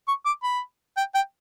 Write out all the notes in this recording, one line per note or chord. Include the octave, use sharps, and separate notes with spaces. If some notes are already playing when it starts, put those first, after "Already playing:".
C#6
D6
B5
G5
G5